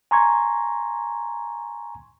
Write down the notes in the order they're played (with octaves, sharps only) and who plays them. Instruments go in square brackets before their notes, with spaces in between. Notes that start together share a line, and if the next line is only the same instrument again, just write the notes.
[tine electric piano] G#5 A#5 C6 C#6 G#6